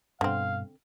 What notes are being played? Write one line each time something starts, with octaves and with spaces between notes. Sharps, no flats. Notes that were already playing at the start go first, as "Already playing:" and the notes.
G2 B2 D3 C4 F5